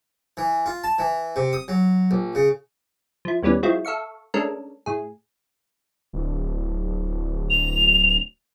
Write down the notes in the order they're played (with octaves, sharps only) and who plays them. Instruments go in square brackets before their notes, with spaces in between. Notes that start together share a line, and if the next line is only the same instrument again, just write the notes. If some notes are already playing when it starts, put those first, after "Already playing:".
[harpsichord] E3
F4
A5
E3
C3
D#6
F#3
A#1
C#3
[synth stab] F3 E4
D#2 E3 G3 B3 C#4
F#3 G#3 C4 E4 F4
A4 E5 F5 C#6
G#3 A3 C#4 D4 A4 A#4
A2 G#4
[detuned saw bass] D1
[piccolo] F7